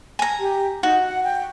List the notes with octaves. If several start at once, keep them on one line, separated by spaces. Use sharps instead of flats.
G#5 A#5
G4
D#4 F#4
F#5
G5